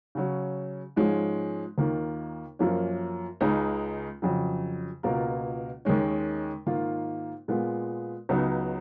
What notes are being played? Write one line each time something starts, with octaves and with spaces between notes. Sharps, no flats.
C#3 F#3 C#4
G#2 F3 G#3 C#4
D#2 D#3 A#3 F4
F#2 F3 A#3 C#4
C#2 C#3 G#3 D#4
F2 C#3 F#3
C#2 B2 A#3 F4 A#4
D#2 D#3 G#3 C#4
G#2 D#3 A#3 F4
A#2 G#3 B3 F4
C#2 C#3 F#3 B3 D#4